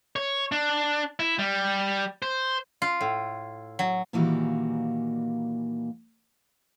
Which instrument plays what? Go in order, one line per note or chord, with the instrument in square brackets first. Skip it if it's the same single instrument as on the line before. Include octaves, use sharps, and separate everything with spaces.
[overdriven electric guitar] C#5
D4
E4
G3
C5
[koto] F4
A2
F#3
[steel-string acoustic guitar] A#2 D#3 E3 G3 A#3 F#4